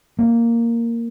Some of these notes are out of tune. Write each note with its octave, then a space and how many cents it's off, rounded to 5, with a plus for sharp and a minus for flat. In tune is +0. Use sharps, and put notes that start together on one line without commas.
A#3 -5